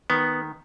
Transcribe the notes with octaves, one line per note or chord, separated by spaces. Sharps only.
D#3 B3